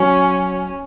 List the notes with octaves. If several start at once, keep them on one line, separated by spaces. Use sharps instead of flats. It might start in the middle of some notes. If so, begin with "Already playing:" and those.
Already playing: F#3 C#4